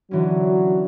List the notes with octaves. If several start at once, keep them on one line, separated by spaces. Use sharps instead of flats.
D3 E3 F#3 C#4